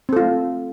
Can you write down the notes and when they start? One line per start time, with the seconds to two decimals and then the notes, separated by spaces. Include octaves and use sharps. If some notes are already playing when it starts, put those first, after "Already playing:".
0.09 C4
0.13 A4
0.16 F4
0.20 A3